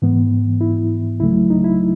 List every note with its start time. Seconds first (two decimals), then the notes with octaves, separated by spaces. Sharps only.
0.02 G#2 E3 B3
0.61 E4
1.20 C#2 C#3 F#3 A3 E4
1.50 D#4
1.64 E4